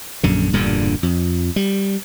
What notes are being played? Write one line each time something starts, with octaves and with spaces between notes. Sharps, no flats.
A#1 F#2 D3
E1 G2 A#2 D3
F2
G3